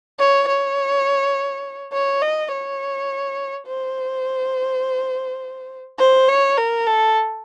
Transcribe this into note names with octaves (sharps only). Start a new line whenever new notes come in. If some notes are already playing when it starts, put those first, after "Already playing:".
C#5
C#5
C#5
D#5
C#5
C5
C5
C#5
A#4
A4